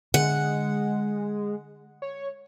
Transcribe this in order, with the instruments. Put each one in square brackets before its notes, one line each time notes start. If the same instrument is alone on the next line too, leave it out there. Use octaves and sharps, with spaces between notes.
[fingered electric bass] D3 [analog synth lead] G#3 [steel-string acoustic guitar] F#5
[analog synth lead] C#5